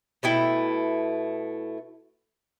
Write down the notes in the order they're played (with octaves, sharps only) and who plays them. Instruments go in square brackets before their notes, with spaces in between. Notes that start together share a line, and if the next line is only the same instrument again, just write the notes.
[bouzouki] B2 A3 E4 G5